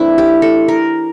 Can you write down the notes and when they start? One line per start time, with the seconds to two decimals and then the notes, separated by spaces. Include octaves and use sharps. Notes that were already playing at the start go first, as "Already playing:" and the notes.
Already playing: E3 A3 C4 D4 E4
0.18 G4
0.42 A4
0.68 A#4